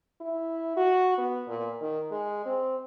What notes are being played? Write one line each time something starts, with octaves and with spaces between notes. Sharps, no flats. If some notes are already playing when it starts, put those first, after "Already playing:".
E4
F#4
B3
A#2
D#3
G#3
C4